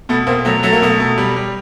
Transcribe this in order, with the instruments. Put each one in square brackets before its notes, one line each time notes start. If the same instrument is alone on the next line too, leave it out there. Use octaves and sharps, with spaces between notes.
[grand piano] B2 A3 B3
B2 A#3 C4
F#3 A3
F#3 A3
A#3
B2 A3
B2
G3
G3